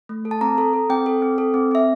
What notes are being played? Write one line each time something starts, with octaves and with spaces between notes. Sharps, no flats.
A3
A4
A5
C4 A#5
A4
A4
C4 G5
A4
C4
A4
C4
C4 E5